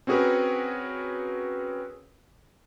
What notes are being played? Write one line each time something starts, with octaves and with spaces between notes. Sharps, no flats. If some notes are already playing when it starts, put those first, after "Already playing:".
C4 C#4 F#4 G#4 A#4 B4